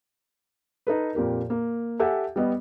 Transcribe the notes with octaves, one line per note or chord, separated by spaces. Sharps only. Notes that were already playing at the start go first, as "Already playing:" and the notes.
D#4 A4 B4
F2 A#2 G4 A#4
A#3
G4 A4 E5 F#5 G#5
G3 B3 D#5